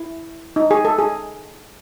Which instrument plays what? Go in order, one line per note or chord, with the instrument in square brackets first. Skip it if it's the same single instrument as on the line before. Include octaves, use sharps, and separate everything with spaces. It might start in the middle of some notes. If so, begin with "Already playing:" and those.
Already playing: [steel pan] E4
D#4
G#4
A4
G#4